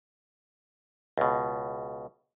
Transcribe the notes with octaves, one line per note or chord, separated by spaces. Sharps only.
C#2 B2